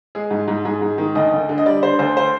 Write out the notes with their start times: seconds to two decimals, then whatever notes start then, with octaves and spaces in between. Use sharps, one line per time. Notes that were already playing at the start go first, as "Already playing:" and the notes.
0.15 G#3 G#4
0.31 G#2
0.48 G#2
0.65 G#2 G#4
0.82 G#2
0.98 D#3
1.15 D2 D#5
1.32 D2
1.49 D3
1.58 D#5
1.66 G3 D5
1.82 D3 C5
1.99 D2 C5
2.17 C5